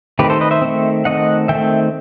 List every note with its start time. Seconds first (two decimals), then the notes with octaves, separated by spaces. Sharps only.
0.19 D#3 A3 C4 G4 B4
0.30 A4 C5
0.41 B4 D#5
0.51 C5 E5
0.62 D#3 A3 C4
1.05 D#3 A3 C4 D#5 F#5
1.48 D#3 A3 C4 E5 G5